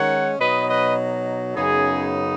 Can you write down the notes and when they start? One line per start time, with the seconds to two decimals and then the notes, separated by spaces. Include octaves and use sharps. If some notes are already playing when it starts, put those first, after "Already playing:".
Already playing: D#3 G#3 C#4 C#5 F#5
0.39 B2 F#3 D#4 B4 D#5
0.69 B4 D#5
1.55 F#2 C#3 B3 D#4 G#4